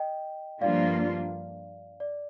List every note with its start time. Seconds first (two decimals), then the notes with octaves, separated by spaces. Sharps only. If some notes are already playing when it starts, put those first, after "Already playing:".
Already playing: D#5 G5
0.61 G2 F3 A#3 D4 F4 D5 F5
2.00 D5